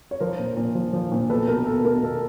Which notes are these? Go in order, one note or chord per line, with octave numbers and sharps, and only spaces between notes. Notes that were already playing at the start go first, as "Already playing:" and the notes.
C#5
F3 A#4 C5
A#2
A#2
F3
F3
A#2
B2 A4 B4
B2 A#4
B2 A4
B2 A#4
B2 A4